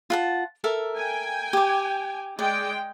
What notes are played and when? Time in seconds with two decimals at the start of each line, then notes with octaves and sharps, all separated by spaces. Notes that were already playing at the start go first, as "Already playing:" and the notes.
0.10 F4 F#5 A5
0.64 A4 A#4 E5
0.97 G5 G#5
1.53 G4 D6
2.39 G#3 D5 G5